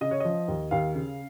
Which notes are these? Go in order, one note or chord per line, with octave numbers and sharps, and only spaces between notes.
C#3 D#5
C#5
F3 D#5
D#2
D#2 F5
C#3